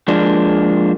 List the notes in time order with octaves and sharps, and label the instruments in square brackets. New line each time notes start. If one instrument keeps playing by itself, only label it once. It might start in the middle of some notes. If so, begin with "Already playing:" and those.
[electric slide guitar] F3 G#3 A#3 D4